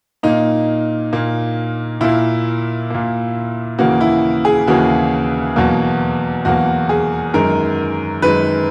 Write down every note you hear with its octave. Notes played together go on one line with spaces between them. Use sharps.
A#2 A#3 D#4
A#2 A#3
A#2 A#3 E4
A#2 A#3
D#2 C#3 E3 A#3 F#4
E4
G#4
D#2 C#3 E3 A#3 F#4
E2 B2 F#3 A#3
E2 B2 F#3 A#3 F#4
G#4
F#2 D#3 G#3 A#4
F#2 D#3 G#3 B4